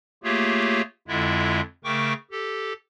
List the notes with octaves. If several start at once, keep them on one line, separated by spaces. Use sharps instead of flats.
A3 A#3 F4 G4 G#4 C#5
F2 D3 G#3 E4 F4 E5
C#3 A3 A#4 G5 C#6 D6
G4 A4